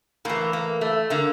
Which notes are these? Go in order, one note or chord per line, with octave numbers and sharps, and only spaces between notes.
A2 E3 A#3
A#3
A3
D3 A#3